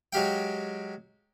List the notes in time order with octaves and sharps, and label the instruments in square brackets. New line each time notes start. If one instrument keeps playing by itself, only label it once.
[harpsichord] F#3 G#3 G4 F5 G5